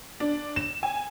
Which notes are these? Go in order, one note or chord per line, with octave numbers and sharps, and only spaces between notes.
D4
E7
G#5